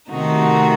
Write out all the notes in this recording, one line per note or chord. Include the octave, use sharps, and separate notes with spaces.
C3 D#3 A3 D#4 F#4